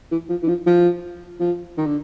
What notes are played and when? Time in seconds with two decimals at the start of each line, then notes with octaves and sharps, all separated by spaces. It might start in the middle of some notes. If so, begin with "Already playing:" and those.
0.11 E3
0.29 F3
0.42 E3
0.48 F3
0.66 F3
1.40 F3
1.77 D#3
1.86 D3